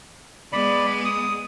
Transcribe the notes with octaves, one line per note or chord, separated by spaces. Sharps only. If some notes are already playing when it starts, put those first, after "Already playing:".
G#3 B3 D5 B5
D#6